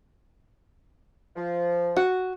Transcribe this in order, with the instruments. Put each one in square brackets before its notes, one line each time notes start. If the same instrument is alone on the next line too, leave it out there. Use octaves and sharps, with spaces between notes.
[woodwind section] F3
[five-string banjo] F#4